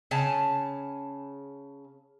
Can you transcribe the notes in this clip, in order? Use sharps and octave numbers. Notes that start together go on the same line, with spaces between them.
C#3 G#5 A5